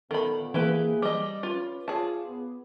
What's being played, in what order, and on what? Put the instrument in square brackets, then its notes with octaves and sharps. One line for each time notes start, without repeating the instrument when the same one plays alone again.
[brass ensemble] A#2 B3 F#5 [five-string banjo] D#3 B5 [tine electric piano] A4
[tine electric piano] E3 A#3 [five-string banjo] E4 G4 B4 [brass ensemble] G#4
[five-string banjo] G3 D#5 [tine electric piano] D6
[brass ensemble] C#4 B4 [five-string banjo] F4
[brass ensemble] F4 C#5 [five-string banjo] G#4 A5
[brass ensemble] B3